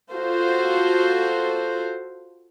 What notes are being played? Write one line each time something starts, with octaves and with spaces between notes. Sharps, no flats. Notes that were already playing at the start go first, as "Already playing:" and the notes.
F4 F#4 A4 C5